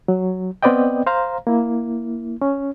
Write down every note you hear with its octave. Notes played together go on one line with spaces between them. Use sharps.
F#3
B3 C4 B4 D5 D#5 G5
C5 F5 A#5
A#3 E4
C#4